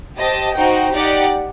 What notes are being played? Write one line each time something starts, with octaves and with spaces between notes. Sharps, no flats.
G4 C5 D#5 A5
D#4 F#4 C5 G5
D#4 G4 D5 F#5